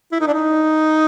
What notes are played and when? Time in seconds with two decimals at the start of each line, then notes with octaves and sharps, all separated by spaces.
0.12 E4
0.20 D#4
0.28 D4
0.34 D#4